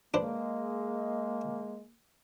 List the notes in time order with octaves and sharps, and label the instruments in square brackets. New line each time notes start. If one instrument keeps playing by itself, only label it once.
[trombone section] G#3 [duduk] A#3 [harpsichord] D4 B4 C5